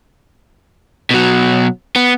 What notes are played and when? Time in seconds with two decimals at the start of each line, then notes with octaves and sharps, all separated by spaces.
1.11 B2 F#3
1.96 B3